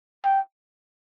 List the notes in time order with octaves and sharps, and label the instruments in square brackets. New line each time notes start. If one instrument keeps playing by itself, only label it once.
[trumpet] G5